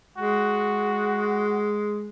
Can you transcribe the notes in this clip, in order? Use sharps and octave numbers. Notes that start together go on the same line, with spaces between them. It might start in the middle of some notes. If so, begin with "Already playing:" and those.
G#3 F#4